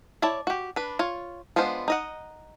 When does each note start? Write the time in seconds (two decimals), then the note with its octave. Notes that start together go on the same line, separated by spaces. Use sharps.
0.22 E4 C#5 D5 A5
0.47 F#4 G4
0.76 D4 B4
0.99 F4 C#5
1.56 G#3 B3 D4 F4 C5
1.88 D#4 D#5 F#5